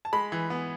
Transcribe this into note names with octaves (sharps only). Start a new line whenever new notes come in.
A5
G#3 B5
E3
B3